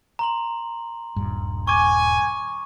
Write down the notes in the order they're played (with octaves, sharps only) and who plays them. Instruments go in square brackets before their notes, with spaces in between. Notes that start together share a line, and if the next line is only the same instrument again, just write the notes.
[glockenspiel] A#5 C6 F#7
[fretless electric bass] D#1 G2
[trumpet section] G#5 [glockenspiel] C#6 D6